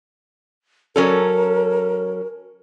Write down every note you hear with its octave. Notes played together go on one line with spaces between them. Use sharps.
F#3 C#4 A4 A#4